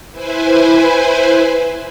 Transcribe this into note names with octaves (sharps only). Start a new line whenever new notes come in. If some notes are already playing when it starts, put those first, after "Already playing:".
E4 B4 C5 G#5